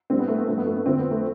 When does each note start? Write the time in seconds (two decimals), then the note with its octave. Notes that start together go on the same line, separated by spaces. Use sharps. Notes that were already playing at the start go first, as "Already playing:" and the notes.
0.10 A2 G3 C4
0.19 B3
0.28 A3
0.38 B3
0.47 G2 F3 A3
0.58 B3
0.66 A3
0.77 B3
0.86 F2 D3 F3 C4
0.99 B3
1.11 A3